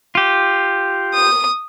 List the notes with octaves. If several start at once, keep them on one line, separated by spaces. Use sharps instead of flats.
F4 G4
D#6